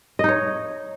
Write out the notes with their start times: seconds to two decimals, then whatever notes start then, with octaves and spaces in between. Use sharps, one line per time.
0.19 D#5
0.24 D#4
0.29 C#5